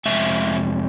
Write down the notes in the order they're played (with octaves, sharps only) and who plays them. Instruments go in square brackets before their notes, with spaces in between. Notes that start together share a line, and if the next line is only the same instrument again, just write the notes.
[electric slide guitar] F2 C3 G#3 E5